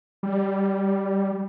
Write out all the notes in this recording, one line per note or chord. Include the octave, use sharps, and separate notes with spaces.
G3